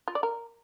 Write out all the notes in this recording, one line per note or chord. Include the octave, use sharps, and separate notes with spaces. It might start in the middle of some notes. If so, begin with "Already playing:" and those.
F4
D5
A#4